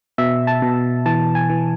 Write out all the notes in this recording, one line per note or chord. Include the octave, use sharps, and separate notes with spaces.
B2 E5
A5
B2
E3 A5
G#5
E3